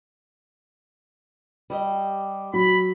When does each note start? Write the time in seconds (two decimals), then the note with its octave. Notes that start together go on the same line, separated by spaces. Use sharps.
1.70 G3 G4 D#5
2.54 F#3 B5